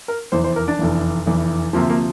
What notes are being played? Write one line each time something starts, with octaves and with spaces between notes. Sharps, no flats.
A#4
F1 E2 E3 C5
C5
A#4
D4
F1 E2 E3
F1 E2 E3
D2 C3 F3 A#3
A#3